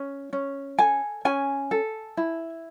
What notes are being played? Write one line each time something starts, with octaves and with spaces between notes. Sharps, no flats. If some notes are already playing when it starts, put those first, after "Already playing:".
Already playing: C#4
C#4
A4 G#5
C#4 G#5
A4
E4